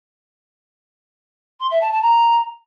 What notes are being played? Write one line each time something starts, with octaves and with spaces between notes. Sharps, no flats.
C6
E5
A5
A5
A#5